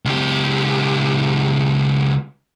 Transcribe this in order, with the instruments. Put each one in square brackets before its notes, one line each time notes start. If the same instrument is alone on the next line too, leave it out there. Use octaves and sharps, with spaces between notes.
[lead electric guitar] C#2 G4